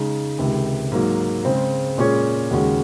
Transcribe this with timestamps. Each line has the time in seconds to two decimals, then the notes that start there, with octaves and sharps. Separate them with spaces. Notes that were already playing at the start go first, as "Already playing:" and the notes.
Already playing: C#3 G#3 D#4
0.38 C#2 C3 D#3
0.92 G#2 F#3 A#3
1.45 C#3 G#3 C4
1.98 A#2 G#3 C#4 G#4 C#5
2.51 D#2 C#3 G#3 C#4 F#4